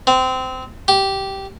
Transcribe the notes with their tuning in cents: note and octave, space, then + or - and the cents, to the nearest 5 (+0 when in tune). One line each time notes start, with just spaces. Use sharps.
C4 -20
G4 -10